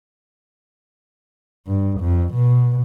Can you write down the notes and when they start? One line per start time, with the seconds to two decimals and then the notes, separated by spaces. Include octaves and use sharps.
1.67 G2
2.00 F2
2.34 B2